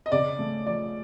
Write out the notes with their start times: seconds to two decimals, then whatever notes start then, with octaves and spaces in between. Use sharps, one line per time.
0.06 D#5
0.12 C#3 D5
0.39 A3
0.66 F3 D5